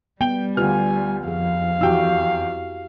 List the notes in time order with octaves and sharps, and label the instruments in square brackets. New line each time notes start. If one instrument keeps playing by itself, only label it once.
[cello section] G3 [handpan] B3 [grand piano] G5 G7
[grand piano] D2 F6 [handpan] F4 G4 B4 [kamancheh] G#5
[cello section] F2 [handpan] G#4 [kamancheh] F5
[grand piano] E2 G5 E6 [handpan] E4 F#4 G4